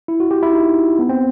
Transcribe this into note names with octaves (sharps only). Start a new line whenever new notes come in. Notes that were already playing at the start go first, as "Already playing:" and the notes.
E4
F#4
G4
E4
D#4
B3
C4